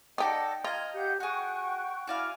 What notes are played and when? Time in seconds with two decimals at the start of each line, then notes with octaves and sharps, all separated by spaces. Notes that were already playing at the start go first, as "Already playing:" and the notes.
0.18 D#4 G4 A4 D5 D#5 F#5 G5
0.64 F4 D#5 A#5 F6 G#6
0.94 G4 F5 F#5 G6
1.20 F#4 G#4 F#5 G5 C#6 F#6
2.07 E4 F#4 D5 F5 G#5